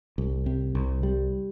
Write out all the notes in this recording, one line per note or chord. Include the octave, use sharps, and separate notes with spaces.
C2
C3
C2
G3